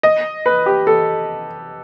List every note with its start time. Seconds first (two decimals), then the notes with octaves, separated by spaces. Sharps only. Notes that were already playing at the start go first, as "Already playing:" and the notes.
0.03 D#5
0.46 B4
0.66 G4
0.87 A4